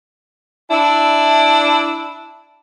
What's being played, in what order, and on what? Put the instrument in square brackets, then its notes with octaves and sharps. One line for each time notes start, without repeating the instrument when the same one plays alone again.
[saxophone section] D4 E4